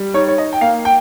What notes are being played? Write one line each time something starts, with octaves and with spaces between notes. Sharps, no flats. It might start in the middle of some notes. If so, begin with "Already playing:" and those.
Already playing: G3
D#4 C#5
C#5
D#5
G5
A#3 F5
G5